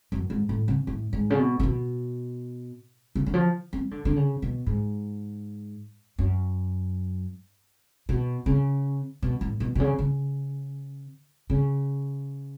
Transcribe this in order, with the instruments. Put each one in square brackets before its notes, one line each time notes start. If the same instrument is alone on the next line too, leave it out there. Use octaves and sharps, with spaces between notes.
[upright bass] F#2
G#2
A2
C#3
A2
G#2
C#3
B2
C#3
B2
C#3
D3
F3
C#4
F3
D3
D3
C#3
B2
G#2
F#2
B2
C#3
B2
A2
B2
B2
C#3
C#3
C#3